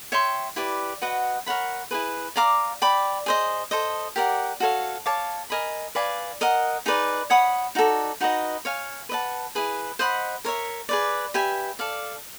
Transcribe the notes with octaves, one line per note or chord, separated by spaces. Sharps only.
C#5 E5 G5 C6
E4 G4 B4 D5
F#4 B4 D#5 F#5
A#4 C#5 F#5 B5
E4 G#4 B4
D5 F5 A#5 D6
D5 G5 B5
G#4 C5 D#5
A4 C5 D#5
G4 A#4 D5 F#5
F#4 A4 C#5 F5
C#5 F5 A5 D6
A#4 D#5 G#5 B5
B4 D5 F5 G#5
A#4 D#5 F#5
D#4 G#4 B4 D5
C#5 F#5 B5 D#6
D#4 F#4 A4 D5
D#4 F#4 B4 D#5
C#5 F5 G#5
B4 D#5 F#5 A5
E4 G#4 B4
C5 D#5 F#5 B5
A#4 C#5 E5
G#4 B4 D5
G4 B4 E5 G#5
A4 D5 F5